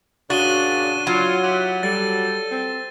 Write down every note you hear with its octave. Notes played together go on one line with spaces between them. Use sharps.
A#2 C#3 D4 F#4 A6 D#7 G7
F#3 F4
E4 G4 F#5
G3 A4 A6
C4